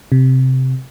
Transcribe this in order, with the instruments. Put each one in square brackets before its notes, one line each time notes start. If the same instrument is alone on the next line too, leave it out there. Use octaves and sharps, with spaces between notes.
[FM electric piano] C3